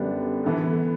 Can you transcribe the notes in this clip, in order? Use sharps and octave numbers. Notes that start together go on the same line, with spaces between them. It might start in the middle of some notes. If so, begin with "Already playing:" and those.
Already playing: F#2 D3 G3 B3 D4
E3 B3 E4 A4